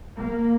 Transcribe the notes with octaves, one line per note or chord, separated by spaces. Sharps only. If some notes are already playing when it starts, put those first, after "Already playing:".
A#3